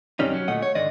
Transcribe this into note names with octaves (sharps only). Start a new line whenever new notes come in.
F#2 C3 D#3 G3 C#4 D#4
F#3 C#4
D2 A#2 A3 D#5 F#5
C#5
G#2 D3 D#3 D5 D#5